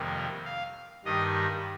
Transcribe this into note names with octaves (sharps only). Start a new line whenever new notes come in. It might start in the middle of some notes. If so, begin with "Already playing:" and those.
Already playing: F2 C3 D#3 G3 A#3
F5
G2 D#3 G3 D#5